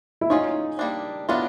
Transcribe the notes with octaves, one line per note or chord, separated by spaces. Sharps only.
E4
C#4 D#4 F4 G#4 C#5
G3 A#3 D4
F#3 B3 D4 E4 F4